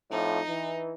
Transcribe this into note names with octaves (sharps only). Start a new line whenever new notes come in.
F2 A2 F3 D#4
E3